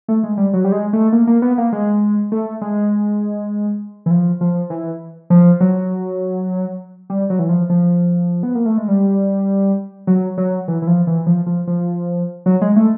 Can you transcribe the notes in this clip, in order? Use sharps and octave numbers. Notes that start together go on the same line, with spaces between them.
A3
G#3
G3
F#3
G3
G#3
A3
A#3
A#3
B3
A#3
G#3
A3
G#3
E3
F3
F3
E3
F3
F#3
G3
F#3
E3
F3
F3
B3
A#3
A3
G#3
G3
F#3
F#3
E3
E3
F3
E3
F3
F3
F3
F#3
G#3
A3